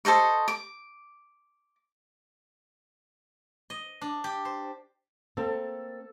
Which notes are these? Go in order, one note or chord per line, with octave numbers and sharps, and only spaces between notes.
A4 C5 D#5 C#6
D6
D#5
D4
G4
C5
A#3 C4 A4